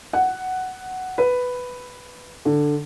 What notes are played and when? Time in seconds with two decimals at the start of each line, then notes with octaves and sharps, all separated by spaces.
0.13 F#5
1.18 B4
2.45 D3